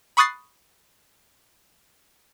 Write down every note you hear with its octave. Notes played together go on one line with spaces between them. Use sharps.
B5 C#6 D#6 F#6 A6 C7